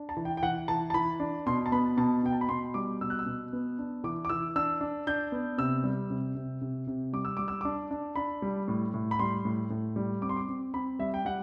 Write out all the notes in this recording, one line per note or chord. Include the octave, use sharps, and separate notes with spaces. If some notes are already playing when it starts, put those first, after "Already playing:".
Already playing: D4
A5
E3
G5
G5
E3 F#5
E3 A5
A5
E3 B5
D4
B2 C6
A5
B3 B5
B2 A5
B2 G5
A5
B5
B2 C6
G3 D6
B2 E6
F#6
E6
B2
B3
D4
E3 D6
D6
E3 E6
D4 E6
D4
D4 G6
B3
C3 E6
G3
C3
C3
C3
C3
G3 D6
E6
G3 D6
E6
D4 D6
D4
D4 B5
G3
A2
A2
B5
G3 C6
A2
A2
G3
C4 D6
C6
D6
C4
C4 B5
G3 E5
G5
G3 F#5